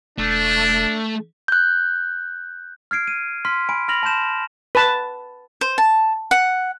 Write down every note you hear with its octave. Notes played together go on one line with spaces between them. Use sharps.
E1 A3 D4
F#6 G6
F6 G#6 C7 D7
D#7
C6 F6 B6
G#5 B5 D7
B5 F6 A#6 F7 F#7
A5 B5 C6 G6 E7
B4 A5
C5
A5
F#5